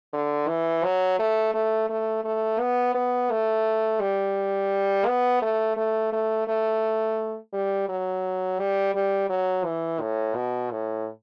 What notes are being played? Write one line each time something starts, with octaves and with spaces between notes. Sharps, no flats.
D3
E3
F#3
A3
A3
A3
A3
B3
B3
A3
G3
B3
A3
A3
A3
A3
G3
F#3
G3
G3
F#3
E3
A2
B2
A2